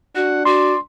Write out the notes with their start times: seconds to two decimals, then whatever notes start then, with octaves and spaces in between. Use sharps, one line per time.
0.15 D4 F#4 F#5
0.45 F#4 D5 C6